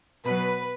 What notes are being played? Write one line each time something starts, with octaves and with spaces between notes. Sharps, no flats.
B2 F#3 B4